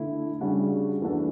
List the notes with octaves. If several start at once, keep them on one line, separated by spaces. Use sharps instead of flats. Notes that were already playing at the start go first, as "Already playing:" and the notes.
Already playing: D3 A3 E4
C#3 G3 D4 F#4
E3 A3 D4 F#4